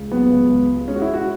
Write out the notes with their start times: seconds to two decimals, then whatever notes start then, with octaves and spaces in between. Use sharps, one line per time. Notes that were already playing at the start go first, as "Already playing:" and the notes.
Already playing: C#2
0.11 F#3 B3
0.31 C#2
0.50 C#2
0.69 G#3
0.88 G#3 C#4
0.96 F#4
1.02 E4
1.08 G#3
1.14 F#4